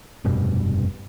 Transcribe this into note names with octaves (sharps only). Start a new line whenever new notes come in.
F1 G2 B2